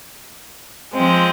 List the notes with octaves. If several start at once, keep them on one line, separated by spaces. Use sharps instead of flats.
F3 G#3 C4